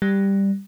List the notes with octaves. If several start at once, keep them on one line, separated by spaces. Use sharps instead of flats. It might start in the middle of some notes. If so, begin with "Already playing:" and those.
G3